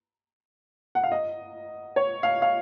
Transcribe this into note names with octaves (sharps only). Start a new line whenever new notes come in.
F#5
F5
D#5
C#5
F5
F5